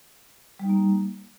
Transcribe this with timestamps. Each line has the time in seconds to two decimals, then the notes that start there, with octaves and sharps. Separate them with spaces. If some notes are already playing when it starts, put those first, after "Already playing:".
0.59 G3
0.64 D#4
0.69 A#3